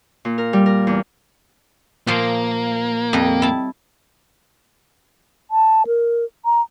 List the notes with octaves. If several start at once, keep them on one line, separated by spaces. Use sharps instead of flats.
A#2
A#4
G3
A#4
E2
A#2 F3 A#3 C6
F2 G3 D#5
E4 A5
A5
A#4
A#5